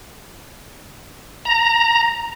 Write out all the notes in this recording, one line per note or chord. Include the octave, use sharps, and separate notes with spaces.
A#5